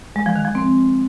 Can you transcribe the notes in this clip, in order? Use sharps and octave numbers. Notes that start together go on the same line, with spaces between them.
G#3
F3
D#3
F3
C4